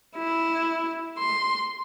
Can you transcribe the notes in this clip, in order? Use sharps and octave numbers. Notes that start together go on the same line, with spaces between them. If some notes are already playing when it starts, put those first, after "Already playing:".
E4
C6